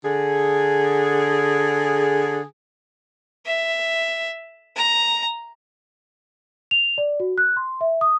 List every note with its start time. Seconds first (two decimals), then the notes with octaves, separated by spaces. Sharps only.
0.05 D3 G#4
3.46 E5
4.76 A#5
6.71 F7
6.98 D5
7.20 F#4
7.38 F#6
7.57 C6
7.81 E5
8.01 D#6